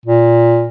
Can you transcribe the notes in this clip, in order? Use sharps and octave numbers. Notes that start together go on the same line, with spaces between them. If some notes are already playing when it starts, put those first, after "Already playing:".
A#2